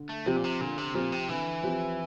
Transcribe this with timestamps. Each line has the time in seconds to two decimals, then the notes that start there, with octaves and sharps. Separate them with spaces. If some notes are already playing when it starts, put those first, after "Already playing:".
Already playing: D3
0.09 A3
0.26 C3 F3 C4 G4
0.36 A#2
0.44 C3
0.61 A#2 D3
0.78 C3
0.94 A#2 F3 C4 G4
1.12 C3
1.29 D3 E3
1.63 F3 C4 G4